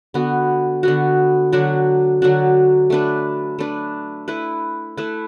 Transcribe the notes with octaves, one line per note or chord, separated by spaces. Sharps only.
D3 B3 F#4
D3 B3 F#4
D3 F#3 D4 F#4
D3 F#3 D4 F#4
A3 D4 B4
A3 D4 B4
A3 E4 B4
A3 E4 B4